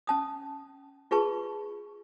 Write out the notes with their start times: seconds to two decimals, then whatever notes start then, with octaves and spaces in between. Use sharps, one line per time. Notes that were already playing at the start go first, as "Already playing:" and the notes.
0.07 C#4 A5 D#6
1.11 F4 G#4 B4 A5 C#6